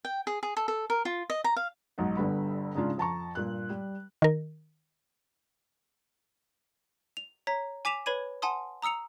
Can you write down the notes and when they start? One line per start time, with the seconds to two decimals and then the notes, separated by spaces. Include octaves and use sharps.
0.05 G5
0.27 G#4
0.43 G#4
0.57 A4
0.68 A4
0.90 A#4
1.05 F4
1.30 D#5
1.44 A#5
1.56 F5
1.98 B1 G#2 D#4 F#5
2.17 G1 D3 G3 B4 B5
2.75 G#2 C#3 C#4 D4 F4
2.98 F2 A5 A#5 C#6
3.35 G2 A#2 F#6
3.70 G3
4.22 D#3 A#4
7.17 F7
7.47 C#5 A#5 B6
7.85 G#5 D6 B6 E7 F7
8.06 B4 C#5 B5 G#6 D#7
8.42 F#5 G#5 A5 C6 D#6
8.82 A#5 D#6 E6 C#7 F7